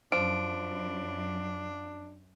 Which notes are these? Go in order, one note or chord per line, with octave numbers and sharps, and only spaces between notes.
F#2 F3 D4 D7